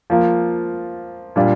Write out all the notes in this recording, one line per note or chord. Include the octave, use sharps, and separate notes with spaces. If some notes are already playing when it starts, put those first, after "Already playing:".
F3 A#3 F4
A#2 G3 D4 F4